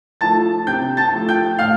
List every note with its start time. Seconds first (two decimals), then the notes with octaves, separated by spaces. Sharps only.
0.21 F3 A3 A5 A6
0.67 C3 G5 G6
0.97 A5 A6
1.13 F3 A3
1.29 G5 G6
1.59 A2 F5 F6